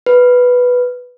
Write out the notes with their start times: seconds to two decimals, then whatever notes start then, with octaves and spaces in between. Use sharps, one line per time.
0.06 B4